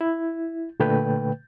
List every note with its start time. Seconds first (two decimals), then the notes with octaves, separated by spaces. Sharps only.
0.01 E4
0.80 A#2 D3 A3 B4 G5